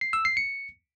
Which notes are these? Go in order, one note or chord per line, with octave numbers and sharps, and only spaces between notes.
C7
E6
C7
C#7